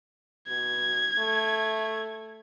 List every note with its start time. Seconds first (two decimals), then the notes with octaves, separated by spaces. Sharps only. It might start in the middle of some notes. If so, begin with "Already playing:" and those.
0.48 B2 G#6
1.18 A3